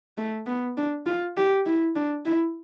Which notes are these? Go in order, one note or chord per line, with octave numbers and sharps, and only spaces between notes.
A3
B3
D4
F4
G4
E4
D4
E4